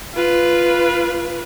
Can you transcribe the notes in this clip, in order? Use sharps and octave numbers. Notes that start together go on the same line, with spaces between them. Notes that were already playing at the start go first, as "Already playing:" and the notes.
F4 B4